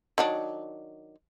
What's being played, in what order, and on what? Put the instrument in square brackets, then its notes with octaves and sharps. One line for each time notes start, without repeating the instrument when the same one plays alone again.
[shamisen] D#3 F#3 D4